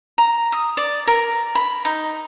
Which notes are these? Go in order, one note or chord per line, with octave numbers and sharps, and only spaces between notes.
A#5
D#6
D5
A#4
B5
D#4